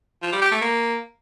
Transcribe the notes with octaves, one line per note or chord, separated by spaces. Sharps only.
F3
G3
G4
A3
A#3